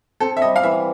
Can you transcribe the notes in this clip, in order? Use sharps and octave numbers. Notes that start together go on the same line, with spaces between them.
C4 A4
E5
G3 D#5
F5
E3 E5